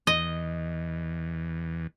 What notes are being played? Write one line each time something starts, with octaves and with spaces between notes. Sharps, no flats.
E2 D#5